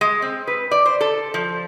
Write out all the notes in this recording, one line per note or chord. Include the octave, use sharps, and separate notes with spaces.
G#3
C4
B4
D5
C5
A4
F3